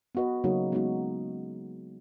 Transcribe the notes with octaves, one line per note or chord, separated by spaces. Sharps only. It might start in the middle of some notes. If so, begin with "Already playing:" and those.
B3 F#4 B4 D#5
C#3 F#3 A#3 D#4 F#4
G#3 B3 D#4 F#4